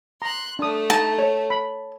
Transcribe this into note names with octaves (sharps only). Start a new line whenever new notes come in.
A#5 C6 F#6
A3 D4 D#6
D#4 A5
C#5
B5